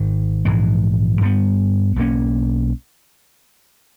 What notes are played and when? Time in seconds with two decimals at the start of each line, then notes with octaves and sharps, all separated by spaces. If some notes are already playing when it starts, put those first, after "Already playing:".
Already playing: G#1 G#2 D#3
0.45 A#1 G#2 E3 G#3
1.21 G2 G3 B3
1.96 B1 B2 A#3 C#4